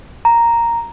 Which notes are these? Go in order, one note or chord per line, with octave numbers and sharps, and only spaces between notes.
A#5